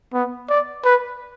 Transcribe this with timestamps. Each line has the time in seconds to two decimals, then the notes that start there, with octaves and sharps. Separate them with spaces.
0.13 B3
0.49 D5
0.85 B4